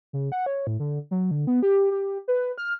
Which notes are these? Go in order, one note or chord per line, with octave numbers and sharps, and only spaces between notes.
C#3
F#5
C#5
A2
D3
F#3
D3
B3
G4
G4
B4
F6